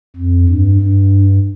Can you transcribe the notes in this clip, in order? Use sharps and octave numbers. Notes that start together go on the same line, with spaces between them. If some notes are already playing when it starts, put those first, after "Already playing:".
F2
G2
G2